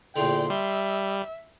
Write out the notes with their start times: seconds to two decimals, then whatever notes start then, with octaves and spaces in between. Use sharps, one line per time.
0.16 A#1 E2 D3 G5 C6
0.50 G3 E5 C6